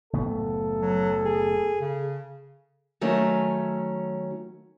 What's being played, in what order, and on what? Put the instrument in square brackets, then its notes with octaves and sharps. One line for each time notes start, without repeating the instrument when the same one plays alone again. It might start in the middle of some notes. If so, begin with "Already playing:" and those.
[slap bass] F#1 A2 B3 [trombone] A4
[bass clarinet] F#3
G#4
C#3
[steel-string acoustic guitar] D#3 F#3 A3 C#4